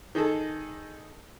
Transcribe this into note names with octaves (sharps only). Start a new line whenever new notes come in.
D#3 D#4 G#4 A4